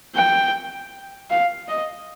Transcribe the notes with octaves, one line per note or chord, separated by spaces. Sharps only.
G5
F5
D#5